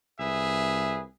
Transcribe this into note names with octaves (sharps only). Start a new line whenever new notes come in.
C2 G#4 B4 E5